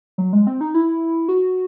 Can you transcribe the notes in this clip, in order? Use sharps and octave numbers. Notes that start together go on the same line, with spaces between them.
F#3
G#3
C4
D#4
E4
F#4